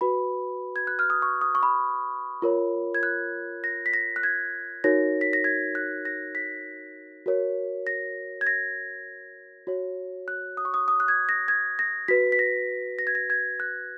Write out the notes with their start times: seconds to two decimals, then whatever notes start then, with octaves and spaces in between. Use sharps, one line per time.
0.01 F#4 B4 B5
0.76 G#6
0.87 F#6
0.99 F6
1.10 D#6
1.22 C#6
1.41 D#6
1.55 C#6
1.63 B5
2.42 F4 A#4 C#5
2.95 G#6
3.03 F#6
3.64 A#6
3.86 B6
3.94 A#6
4.16 F#6
4.23 G#6
4.84 D#4 F#4 A#4 C#5 A#6
5.21 B6
5.33 A#6
5.44 G#6
5.75 F#6
6.05 A#6
6.35 B6
7.26 F#4 A#4 C#5
7.87 A#6
8.41 G#6
8.47 A#6
9.67 F#4 C#5
10.28 F#6
10.57 D#6
10.65 C#6
10.74 D#6
10.88 D#6
11.00 F#6
11.08 G#6
11.29 A#6
11.48 G#6
11.79 A#6
12.08 F#4 B4 B6
12.32 B6
12.39 A#6
12.99 A#6
13.07 G#6
13.15 A#6
13.30 G#6
13.60 F#6